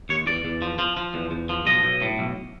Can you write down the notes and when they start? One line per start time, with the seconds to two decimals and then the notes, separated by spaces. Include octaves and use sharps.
0.09 D#2 C#5
0.27 E2 D5
0.45 E2
0.62 F3
0.79 F3
0.97 F3
1.14 E2
1.31 E2
1.49 F3
1.66 B1 D#5
1.83 B1
2.02 A2
2.19 B1